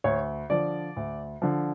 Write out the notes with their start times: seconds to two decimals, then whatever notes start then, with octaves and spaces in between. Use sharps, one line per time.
0.04 D2 C#5
0.50 D3 F3 D5
0.96 D2
1.42 D3 F3